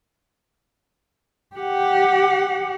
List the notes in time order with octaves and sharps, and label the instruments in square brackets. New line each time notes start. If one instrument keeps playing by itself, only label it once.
[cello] G4 F#5